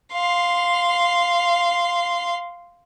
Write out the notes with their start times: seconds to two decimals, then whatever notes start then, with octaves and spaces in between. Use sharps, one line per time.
0.12 F5 C6